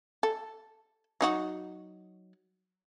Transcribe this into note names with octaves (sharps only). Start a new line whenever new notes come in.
A4
F#3 D#4 F#4